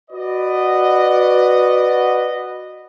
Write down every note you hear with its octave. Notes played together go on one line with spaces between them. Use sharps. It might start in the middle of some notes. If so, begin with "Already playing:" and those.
F#4 B4 D5 D#5